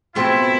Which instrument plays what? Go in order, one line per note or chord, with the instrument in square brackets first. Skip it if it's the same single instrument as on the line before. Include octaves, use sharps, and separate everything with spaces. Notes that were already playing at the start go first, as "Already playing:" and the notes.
[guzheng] B2 A3 C4 F4 [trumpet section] E4